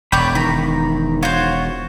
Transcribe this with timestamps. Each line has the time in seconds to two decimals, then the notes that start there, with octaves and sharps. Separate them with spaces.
0.12 E1 C#5 D5 G5 B5
0.35 D#3 A#5 B5
1.23 F4 F#4 C5 C#5